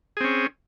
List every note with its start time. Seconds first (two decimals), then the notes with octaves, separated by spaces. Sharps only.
0.17 G#4
0.21 C4
0.24 C#4